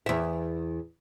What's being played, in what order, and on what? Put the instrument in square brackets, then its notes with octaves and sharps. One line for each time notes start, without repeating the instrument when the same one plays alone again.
[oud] E2 E5